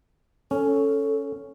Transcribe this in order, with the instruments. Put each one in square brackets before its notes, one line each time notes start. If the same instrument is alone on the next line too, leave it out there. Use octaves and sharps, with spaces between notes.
[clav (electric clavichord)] C#4 [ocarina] A4